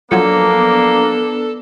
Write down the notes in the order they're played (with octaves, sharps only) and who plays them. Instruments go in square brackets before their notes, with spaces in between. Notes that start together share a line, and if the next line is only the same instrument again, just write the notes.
[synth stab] F3 F#3 [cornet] A#3 [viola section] B3 D4 [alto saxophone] A4